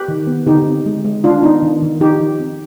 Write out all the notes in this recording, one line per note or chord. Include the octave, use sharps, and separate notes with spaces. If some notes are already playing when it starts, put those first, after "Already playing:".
Already playing: G4 B4
D#3
B3
D3 D#4 G4
C4
G#3
G#3
D#3 D4 F4
B3 D#4
D#3
D#3
F3 D#4 G4
F3
C4